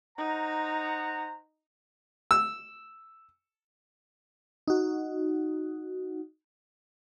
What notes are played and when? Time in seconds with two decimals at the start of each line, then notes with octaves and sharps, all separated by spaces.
0.18 D#4 C5 F#5 A#5
2.31 E6
4.68 D#4 F#4